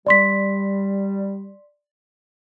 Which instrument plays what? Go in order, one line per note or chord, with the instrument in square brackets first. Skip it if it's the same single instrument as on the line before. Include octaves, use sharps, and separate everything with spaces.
[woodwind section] G3 [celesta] D5 C6 B6